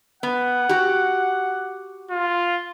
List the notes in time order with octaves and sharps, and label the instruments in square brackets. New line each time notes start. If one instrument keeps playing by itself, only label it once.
[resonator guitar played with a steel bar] B3 [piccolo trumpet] F#5
[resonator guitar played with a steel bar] F#4 G4
[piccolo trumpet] F4